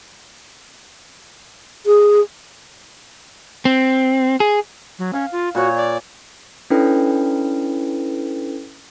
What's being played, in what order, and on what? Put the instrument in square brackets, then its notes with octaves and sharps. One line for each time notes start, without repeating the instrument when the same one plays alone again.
[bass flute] G#4
[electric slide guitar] C4
G#4
[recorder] F#3
[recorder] C#4 [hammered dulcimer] F5
[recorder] F4
[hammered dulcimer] A#2 C#5 [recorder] F#4
[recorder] D5
[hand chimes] C#4 D4 E4 A4 B4 G5